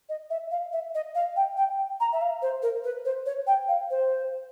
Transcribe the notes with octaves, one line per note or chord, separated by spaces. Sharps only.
D#5
E5
F5
E5
D#5
F5
G5
G5
A#5
E5
F5
C5
A#4
B4
C5
C#5
G5
F5
C5